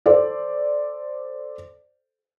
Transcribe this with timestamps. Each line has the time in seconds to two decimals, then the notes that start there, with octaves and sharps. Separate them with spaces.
0.06 A4 C5 D5